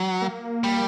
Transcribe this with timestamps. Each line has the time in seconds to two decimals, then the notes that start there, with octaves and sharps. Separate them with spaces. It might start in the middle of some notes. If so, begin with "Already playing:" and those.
Already playing: F#3
0.22 A#3
0.64 G3